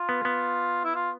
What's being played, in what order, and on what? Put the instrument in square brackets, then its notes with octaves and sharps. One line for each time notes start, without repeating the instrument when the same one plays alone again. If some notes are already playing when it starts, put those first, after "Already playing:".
Already playing: [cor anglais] F4
[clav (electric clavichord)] B3
B3
[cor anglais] E4
F4